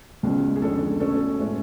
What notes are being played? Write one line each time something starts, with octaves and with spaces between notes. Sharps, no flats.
C#2 B2 G#3 C#4
G#4
F2 D3 G#3 C#4 A4
B2 A3 C#4 A4
A2 G#3 C#4